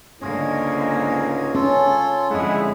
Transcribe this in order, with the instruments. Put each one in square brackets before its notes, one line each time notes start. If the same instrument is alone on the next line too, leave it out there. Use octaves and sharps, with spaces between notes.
[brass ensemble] C#2 G#2 [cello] D3 A#3 [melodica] G#4 C#5
[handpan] C#4 [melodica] F4 A4
[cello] F2 D3 [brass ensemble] G#3 E4 [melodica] G#4 F#5